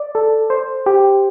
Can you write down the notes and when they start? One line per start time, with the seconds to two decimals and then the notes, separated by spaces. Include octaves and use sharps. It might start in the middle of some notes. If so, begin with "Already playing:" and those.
Already playing: D5
0.15 A4
0.50 C5
0.86 G4